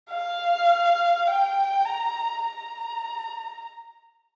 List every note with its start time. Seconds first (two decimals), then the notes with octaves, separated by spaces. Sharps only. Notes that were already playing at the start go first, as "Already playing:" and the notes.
0.10 F5
1.28 G5
1.85 A#5
2.45 A#5